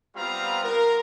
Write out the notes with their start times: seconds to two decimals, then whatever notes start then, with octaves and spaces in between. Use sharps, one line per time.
0.16 G3 B3 C4 F4 F5 A#5
0.63 A#4